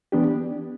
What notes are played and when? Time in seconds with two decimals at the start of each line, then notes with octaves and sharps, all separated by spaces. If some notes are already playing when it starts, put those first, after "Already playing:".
0.12 E3 B3 D4 G4